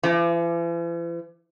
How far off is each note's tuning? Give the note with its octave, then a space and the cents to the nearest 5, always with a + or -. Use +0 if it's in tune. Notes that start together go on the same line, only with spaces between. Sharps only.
E3 +45